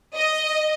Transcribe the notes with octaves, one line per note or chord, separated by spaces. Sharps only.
D#5